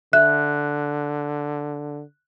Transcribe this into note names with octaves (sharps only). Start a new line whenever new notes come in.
D3 E5 F#6